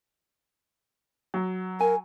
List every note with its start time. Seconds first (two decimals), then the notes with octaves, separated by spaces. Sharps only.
1.34 F#3
1.80 A#4 G#5